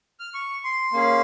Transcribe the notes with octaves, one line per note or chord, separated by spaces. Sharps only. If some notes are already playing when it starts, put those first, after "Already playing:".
F6
C#6
C6
A#3 C#4 G#4